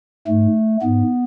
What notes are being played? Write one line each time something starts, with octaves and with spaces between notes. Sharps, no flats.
G#2 A3
G#2 B3